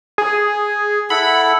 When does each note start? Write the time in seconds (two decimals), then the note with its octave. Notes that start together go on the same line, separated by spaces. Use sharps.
0.18 G#4
1.10 E4 A4 F#5 B5